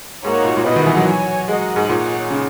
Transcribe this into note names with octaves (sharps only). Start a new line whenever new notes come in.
G#2 A#3 D#4 F#4 C#5
A#2
A#2
B2 E4 B4 D#5 F#5
D#3
E3
F#3
F#4 C#5 G#5
G#3 F#4 A#4 D#5 F#5
G#2
A#2 D#4 G#4 C#5 F#5
C#3